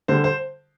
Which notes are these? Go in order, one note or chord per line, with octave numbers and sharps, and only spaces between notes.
D3 G3 C5
C5